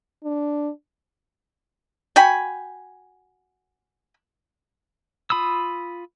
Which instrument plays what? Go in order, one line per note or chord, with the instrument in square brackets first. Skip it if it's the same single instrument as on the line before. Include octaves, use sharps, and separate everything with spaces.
[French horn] D4
[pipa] F#4 G5 G#5 B5
[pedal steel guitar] F4 B5 D#6 E6